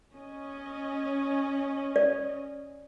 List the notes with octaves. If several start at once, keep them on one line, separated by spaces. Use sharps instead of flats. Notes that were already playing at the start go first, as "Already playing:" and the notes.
C#4 D#5
D5